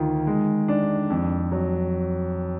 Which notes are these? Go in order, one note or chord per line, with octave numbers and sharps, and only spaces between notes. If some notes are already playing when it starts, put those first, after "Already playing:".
Already playing: D2 D#3 F4
G#3
D4
F2
F#3